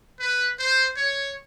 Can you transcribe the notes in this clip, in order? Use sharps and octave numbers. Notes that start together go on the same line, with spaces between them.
B4
C5
C#5